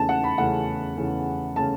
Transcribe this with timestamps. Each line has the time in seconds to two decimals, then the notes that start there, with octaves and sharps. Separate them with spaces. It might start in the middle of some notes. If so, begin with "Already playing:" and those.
Already playing: E2 C#3 A3 C#4 A5
0.09 F#5
0.24 B5
0.38 E2 C#3 A3 C#4 F#5
0.97 E2 C#3 A3 C#4
1.56 C#3 A3 C#4 A5